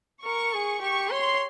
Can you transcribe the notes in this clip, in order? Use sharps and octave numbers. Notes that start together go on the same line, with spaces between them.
A#4 C#6
G#4
G4 C#6
C#5 C6